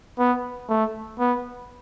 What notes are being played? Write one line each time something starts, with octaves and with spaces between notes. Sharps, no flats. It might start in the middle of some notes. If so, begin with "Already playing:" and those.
B3
A3
B3